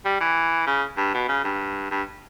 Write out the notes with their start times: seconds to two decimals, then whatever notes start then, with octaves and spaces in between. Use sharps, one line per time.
0.05 G3
0.21 E3
0.67 C#3
0.98 G2
1.14 B2
1.28 C#3
1.44 G2
1.91 G2